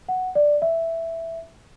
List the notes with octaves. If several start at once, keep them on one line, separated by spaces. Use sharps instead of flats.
F#5
D5
E5